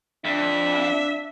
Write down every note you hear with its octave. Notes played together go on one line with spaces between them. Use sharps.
F2 D4 E5